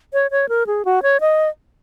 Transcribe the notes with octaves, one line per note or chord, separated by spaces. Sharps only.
C#5
C#5
A#4
G#4
F#4
C#5
D#5